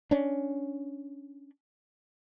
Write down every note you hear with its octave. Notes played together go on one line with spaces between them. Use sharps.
C#4 D4